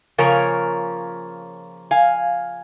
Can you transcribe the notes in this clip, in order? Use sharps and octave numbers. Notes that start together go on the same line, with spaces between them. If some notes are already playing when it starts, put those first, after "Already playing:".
C#3 F3 A#3 C#4 A#4 C#5
F5 G#5